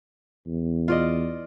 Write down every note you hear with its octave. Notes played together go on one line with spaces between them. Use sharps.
E2
F4 D5 D#5